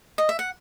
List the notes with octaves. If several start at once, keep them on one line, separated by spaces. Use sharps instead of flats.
D#5
E5
F#5